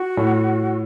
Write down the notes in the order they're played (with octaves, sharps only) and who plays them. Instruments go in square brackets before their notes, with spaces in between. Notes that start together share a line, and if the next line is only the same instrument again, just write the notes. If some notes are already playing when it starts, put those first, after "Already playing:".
Already playing: [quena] F#4
[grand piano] A2